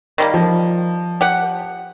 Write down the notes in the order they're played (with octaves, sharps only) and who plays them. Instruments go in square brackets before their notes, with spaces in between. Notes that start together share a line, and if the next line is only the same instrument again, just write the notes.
[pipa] D#3 G3 A#3
[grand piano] F3
[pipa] G4 F#5